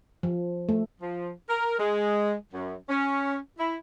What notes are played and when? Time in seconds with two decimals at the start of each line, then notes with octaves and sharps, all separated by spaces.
0.23 F3
0.69 A3
1.01 F3
1.49 A#4
1.78 G#3
2.52 F#2
2.89 C#4
3.59 E4